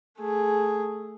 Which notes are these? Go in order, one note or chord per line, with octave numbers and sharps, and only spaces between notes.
A3 G#4